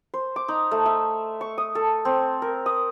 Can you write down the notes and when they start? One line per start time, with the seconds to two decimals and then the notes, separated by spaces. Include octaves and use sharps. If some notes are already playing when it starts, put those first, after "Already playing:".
0.14 C5
0.36 D6
0.48 D#4
0.71 A3
0.86 E5
1.41 C#6
1.58 D#6
1.75 A4
2.05 C4
2.42 A#4
2.66 D#6